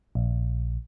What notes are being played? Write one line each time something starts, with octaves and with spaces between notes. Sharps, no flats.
A#1